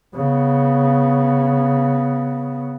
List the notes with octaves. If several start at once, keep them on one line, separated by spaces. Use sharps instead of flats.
C#3 B3